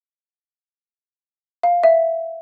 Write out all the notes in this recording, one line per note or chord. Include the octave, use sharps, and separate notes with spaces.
F5
E5